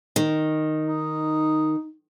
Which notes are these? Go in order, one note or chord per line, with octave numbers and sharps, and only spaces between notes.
D#3
D#4